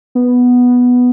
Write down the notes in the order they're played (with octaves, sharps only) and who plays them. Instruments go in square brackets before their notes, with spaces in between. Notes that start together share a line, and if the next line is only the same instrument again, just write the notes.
[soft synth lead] B3